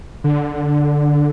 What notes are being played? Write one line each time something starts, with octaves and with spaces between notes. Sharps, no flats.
D3